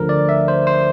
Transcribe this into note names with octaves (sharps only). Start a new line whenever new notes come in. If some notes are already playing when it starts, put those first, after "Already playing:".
Already playing: D2 D3 F3 A#4
D5
E5
C5
C5